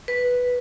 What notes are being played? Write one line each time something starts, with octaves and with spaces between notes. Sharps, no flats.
B4